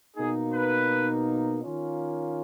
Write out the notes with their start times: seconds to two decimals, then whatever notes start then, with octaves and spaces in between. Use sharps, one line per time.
0.16 B2 A#3 D#4 G#4
0.53 B4
1.63 D#3 A#3 C#4 F4